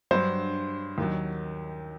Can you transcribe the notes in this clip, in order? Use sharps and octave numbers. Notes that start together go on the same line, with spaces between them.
G2 F#3 C5
D#2 D#3 F#3